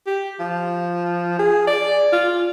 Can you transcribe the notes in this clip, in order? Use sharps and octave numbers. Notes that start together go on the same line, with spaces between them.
G4
F3
G#4
D5
F4